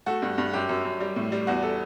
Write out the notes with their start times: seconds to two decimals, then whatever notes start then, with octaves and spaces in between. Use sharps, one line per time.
0.06 A3 F#4 A4
0.22 G2
0.38 G2
0.53 F#2 G4
0.69 F#2
0.85 F#2
1.00 G3
1.16 A2
1.32 G3
1.47 E2 F#4
1.63 A4